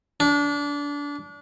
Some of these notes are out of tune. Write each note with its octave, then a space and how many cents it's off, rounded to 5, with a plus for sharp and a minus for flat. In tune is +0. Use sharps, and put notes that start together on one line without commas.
D4 -25